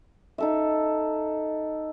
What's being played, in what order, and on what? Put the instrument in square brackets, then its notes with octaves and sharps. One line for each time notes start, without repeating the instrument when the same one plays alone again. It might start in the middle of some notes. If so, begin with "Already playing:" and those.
[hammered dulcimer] D#4 A4 E5